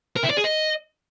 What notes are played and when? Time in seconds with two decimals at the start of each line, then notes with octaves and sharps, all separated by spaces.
0.17 A#4
0.24 E4
0.31 D5
0.38 G#4
0.45 D#5